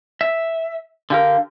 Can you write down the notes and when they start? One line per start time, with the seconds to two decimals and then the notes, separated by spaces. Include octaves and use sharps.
0.21 E5
1.10 D3 G4 A#4 F5